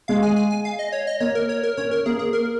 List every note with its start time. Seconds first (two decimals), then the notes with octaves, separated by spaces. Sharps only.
0.08 G#3 F5
0.23 G#5
0.36 G#5
0.51 G#5
0.65 F5
0.79 D#5
0.92 C#5
1.07 D#5
1.20 A#3 C#5
1.35 A#4
1.49 C#5
1.63 A#4
1.77 C#4 C#5
1.91 A#4
2.06 A#3 G#4
2.19 G#4
2.33 A#4